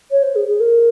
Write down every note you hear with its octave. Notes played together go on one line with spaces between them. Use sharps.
C#5
C5
G#4
G#4
A#4